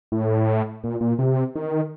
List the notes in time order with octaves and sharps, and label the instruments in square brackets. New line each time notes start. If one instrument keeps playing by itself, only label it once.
[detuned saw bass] A2
A#2
A#2
C3
D#3